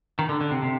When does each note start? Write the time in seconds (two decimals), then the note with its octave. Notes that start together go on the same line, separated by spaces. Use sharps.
0.19 D#3
0.29 D3
0.41 D3
0.51 C3
0.62 C3